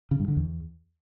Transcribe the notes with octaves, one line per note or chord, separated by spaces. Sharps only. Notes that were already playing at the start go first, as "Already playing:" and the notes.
C#3
G2
D3
E2